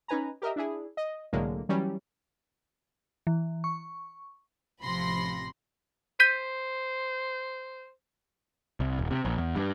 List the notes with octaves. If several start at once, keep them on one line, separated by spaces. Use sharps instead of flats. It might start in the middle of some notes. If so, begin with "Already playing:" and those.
C#4 D#4 B4 G#5 A#5
G4 A#4 D#5 E5
D4 E4 G#4
D#5
C2 A2 D3 F#3 G#3 A#3
E3 F#3 G3 C#4
E3
C#6
A1 C3 F3 B5 C6 A#6
C5 G6 B6 D#7
C2
D#1
C3
A#1
E2
G2